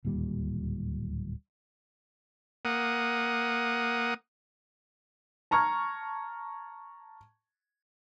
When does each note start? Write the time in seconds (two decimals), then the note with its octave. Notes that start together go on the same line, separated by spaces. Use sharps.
0.05 D1 D#2 A#2 G3
2.65 A#3 F#5 D#6
5.51 A5 A#5 C#6 F6 G#6